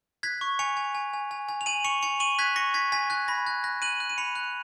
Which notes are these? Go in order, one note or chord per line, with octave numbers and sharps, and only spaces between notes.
F#6 G#6 B6
C#6
G#5 C#7 F7
G#5
G#5
G#5
G#5
G#5
F7
G#5 D#7 F#7
C#6 C#7 F7
G#5 C#7 F7
C#6 D#7 F#7
F#6 G#6 B6
C#6 A#6 C#7
C#6 G#6 B6
G#5 G#6 B6
F#6 G#6
B5 A#6
F#6 G#6
F#6 A#6
F#6 D#7 F#7
F#6
D#7
B5 C#7 F7
F#6